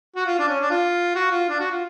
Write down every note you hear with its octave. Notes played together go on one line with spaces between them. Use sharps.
F#4
F4
D4
C#4
D4
F4
F#4
F4
D4
F#4
F4